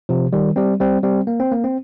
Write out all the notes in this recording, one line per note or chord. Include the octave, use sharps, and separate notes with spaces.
C3 F3
D#3 G3
G3 C4
G3 C4
G3 C4
A#3
C4
A#3
C4